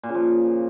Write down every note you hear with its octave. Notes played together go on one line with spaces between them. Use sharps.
A#2
C#3
F3